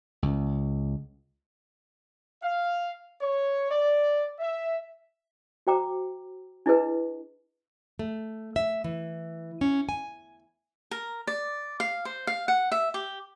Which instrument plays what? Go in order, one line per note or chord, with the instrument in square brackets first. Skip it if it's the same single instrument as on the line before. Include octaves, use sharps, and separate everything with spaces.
[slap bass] C#2
[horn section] F5
C#5
D5
E5
[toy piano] F#4 C5 G5 A#5 D6
D4 E4 G#4 B4 D#5
[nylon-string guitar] A3
E5
E3
C#4
G#5
[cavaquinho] A#4
D5
F5
C5
F5
F#5
E5
G4